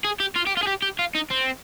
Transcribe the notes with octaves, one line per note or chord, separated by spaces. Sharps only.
G#4
G4
F4
G4
F4
G#4
G4
G4
F4
D#4
C4